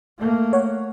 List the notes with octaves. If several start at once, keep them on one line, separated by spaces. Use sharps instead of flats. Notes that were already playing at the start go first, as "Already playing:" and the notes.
A3 A#3
C#5 F#5